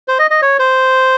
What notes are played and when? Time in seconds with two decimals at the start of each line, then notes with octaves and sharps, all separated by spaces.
0.08 C5
0.19 D#5
0.31 D#5
0.42 C#5
0.59 C5